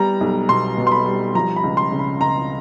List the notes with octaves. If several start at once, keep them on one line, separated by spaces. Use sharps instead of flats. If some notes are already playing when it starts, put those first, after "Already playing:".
Already playing: G3 B3 A#5
B1
B2 C6
B2
C6
B5
G3
F3 A#5
B5
C#2
C6
C#3
B5
C#2 A#5